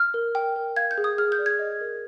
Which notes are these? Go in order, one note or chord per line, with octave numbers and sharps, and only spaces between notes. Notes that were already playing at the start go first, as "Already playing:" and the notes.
Already playing: F6
A#4
G5
A#4
F5 G#6
G6
G#4
D#6
G#4 F6
G6
D5
G#6
D#5
A#4